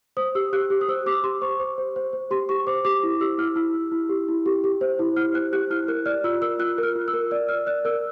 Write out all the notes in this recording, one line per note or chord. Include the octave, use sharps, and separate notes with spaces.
C5 D#6
G4 E6
G4 F#6
G4
D#6
C5 E6
G4 D6
G4 C6
C5 C#6
C5
C5
C5
C5
G4 C6
G4 C#6
C5 D6
G4 D6
E4
G4 E6
E4 F6
E4 E6
E4
E4
G4
E4
G4
G4
C5
E4
E4 F6
C5 F#6
G4 F#6
E4 F6
A#4 F#6
D5 F6
F4 E6
A#4 E6
F4 F#6
A#4 F6
F4
E6
A#4
D5 E6
D5 F6
D5 F#6
A#4 E6